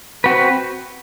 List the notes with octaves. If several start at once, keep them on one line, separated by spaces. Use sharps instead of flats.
C4 F#4 B4